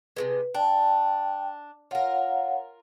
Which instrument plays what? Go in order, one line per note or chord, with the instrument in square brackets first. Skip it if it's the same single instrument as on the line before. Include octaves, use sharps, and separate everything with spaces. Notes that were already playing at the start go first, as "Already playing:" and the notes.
[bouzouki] C3 D#3 G#3 [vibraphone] B4
[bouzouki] D4 [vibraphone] G5
[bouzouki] F4 A#4 [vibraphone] C#5 F5 F#5